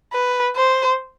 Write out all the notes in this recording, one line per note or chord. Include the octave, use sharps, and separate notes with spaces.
B4
C5